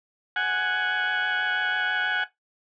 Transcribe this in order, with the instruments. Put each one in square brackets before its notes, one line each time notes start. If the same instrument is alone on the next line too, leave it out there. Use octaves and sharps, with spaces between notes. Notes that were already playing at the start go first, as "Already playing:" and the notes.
[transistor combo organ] F#5 G#5